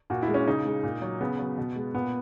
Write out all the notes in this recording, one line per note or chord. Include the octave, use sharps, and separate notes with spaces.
A#2 F#4
E4
G#3
C#4
C#3 D#4
G#3
A#2
F#3
C#3 B3
F#3
B2
G#3
A#2 B3